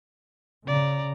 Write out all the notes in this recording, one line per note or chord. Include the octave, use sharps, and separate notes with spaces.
C#3 D5 A#5